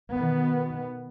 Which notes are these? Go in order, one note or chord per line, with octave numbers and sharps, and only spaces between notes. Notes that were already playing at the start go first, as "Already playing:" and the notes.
B2 D#3 B3